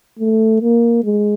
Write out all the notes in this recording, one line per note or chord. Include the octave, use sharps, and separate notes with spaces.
A3
A#3
G#3